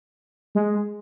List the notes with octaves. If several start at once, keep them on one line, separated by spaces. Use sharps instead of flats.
G#3